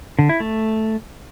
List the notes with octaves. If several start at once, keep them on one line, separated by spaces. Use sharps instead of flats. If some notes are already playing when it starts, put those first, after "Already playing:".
D3
E4
A3